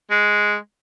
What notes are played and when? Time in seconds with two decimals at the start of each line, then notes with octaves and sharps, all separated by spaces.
0.11 G#3